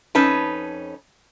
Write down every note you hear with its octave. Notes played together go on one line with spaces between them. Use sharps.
F2 C#4 D#4 B4 A5